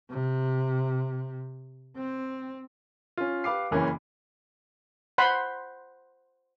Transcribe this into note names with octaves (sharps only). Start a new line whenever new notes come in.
C3
C4
C#4 F4
G4 B4 F5 D6 C7
F#1 E3 A#3 C#4
C5 F#5 B5 C6